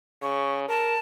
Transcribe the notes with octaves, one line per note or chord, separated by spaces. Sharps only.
C#3 C#6
A#4 A5